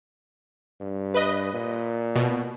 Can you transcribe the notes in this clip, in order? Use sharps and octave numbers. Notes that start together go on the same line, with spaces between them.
G2
B4 D#5
A#2
B2